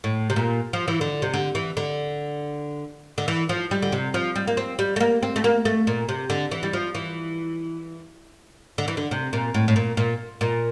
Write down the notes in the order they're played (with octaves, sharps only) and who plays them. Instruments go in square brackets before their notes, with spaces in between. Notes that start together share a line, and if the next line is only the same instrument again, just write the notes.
[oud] A2
C3
A#2
F3
E3
D3
C3
D3
E3
D3
D3
E3
F3
G3
D3
C3
F3
G3
A#3
C4
G3
A3
A#3
C4
A3
A#3
A3
A#2
C3
D3
E3
G3
F3
E3
D3
E3
D3
C3
A#2
A2
A2
A#2
A#2
A#2